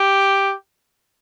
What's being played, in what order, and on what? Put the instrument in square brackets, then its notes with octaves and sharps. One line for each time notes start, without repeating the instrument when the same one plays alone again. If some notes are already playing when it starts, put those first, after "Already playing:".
Already playing: [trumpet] G4